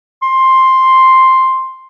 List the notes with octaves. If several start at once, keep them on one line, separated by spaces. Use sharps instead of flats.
C6